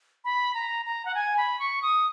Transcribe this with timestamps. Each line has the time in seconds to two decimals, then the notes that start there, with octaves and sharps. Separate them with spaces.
0.25 B5
0.54 A#5
0.86 A#5
1.05 F#5
1.15 G#5
1.37 B5
1.59 C#6
1.82 D#6